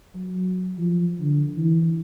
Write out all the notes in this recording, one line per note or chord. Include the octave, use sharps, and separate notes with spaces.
F#3
F3
D3
E3